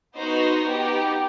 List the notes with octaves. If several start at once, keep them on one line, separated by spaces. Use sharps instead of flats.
B3 D#4 F#4 C5
B3 D#4 G4